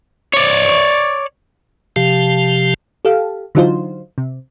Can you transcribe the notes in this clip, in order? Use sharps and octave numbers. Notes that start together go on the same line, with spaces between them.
C#5 D5
C3 F3 G4 F5 A5
G4 A4 F5
D3 E3 F#3 D#4 F4 C5
C3